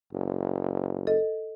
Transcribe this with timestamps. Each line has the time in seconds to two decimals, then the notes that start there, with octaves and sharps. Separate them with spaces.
0.13 F#1
1.07 A4 D#5